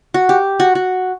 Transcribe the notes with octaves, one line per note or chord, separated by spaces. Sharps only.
F#4
G4
F#4
F#4